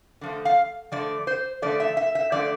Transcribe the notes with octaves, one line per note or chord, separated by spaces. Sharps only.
D3 F3 A3
F5
D3 F3 A3 D5
C5
D3 F3 A3 D5
E5
E5
E5
D3 F3 A3 D5